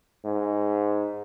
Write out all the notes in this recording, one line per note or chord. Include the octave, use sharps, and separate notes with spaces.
G#2